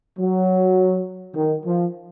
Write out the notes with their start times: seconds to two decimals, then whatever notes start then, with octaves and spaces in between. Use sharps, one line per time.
0.17 F#3
1.34 D#3
1.64 F3